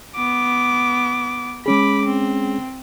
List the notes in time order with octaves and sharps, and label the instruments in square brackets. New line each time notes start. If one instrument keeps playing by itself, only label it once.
[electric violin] B3 D6
[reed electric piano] G#3 C#4 G#4 [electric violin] B5 D6
[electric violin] C4